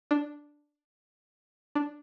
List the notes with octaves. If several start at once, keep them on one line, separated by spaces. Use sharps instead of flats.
D4
D4